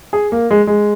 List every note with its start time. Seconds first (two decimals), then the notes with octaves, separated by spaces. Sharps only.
0.13 G#4
0.32 A#3
0.51 G#3
0.67 G#3